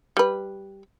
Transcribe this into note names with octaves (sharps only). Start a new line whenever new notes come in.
G3 B4